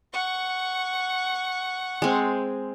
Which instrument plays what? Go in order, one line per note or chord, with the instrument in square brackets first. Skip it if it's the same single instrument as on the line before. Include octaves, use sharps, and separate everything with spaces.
[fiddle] F#5 C#6
[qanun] G#3 C4